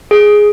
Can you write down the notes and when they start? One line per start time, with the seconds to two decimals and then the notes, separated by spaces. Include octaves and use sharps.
0.11 G#4